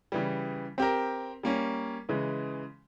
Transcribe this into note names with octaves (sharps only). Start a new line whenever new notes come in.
C#3 E3 G3
C4 G4 A#4
G3 A#3 C#4
C#3 E3 G#3